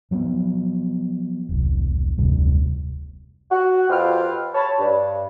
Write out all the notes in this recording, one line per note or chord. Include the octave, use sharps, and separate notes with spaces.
F3 F#3 A#3 B3
E1 C2
F1 D2 C3 G3
F#4
F2 C4 F4 G4 B4 F6
C#5 A5 B5
G2